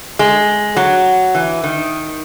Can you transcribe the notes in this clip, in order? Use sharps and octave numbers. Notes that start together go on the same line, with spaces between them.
G#3
F#3
E3
D#3